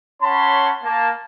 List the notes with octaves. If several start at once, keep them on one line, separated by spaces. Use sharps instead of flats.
C#4 C#5 F#5 A5 B5 C6
A#3 A5